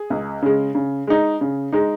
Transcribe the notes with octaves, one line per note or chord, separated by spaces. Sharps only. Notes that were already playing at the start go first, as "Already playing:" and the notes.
Already playing: G#4
C#2
C#3 G#3
C#3
G#3 D#4
C#3
G#3 D#4